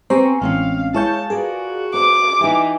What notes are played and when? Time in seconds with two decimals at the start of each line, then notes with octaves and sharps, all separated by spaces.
0.10 C4 G4 C5 G#5 A#5 C#6
0.42 A1 E3 G#3 C4 C#4 F5
0.94 G#3 E4 C#5 F5 A5 G6
1.30 F4 F#4 G#4 A#4 D5
1.94 C5 D6
2.41 E3 D#4 G4